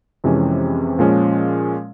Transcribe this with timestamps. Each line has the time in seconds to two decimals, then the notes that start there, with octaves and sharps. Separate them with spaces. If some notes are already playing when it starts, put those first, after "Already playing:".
0.24 F2 C3 E3 G#3 C#4
0.99 A#2 F3 G#3 C#4